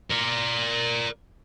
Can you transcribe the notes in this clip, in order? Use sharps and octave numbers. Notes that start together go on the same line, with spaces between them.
A#4 D5